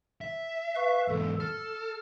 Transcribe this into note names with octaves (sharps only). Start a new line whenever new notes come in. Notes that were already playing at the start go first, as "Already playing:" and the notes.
E5
B4 F5 C#6
E2 G#2 A4
A4 F6